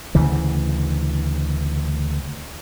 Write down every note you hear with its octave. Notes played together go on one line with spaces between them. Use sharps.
D2 C#3 E3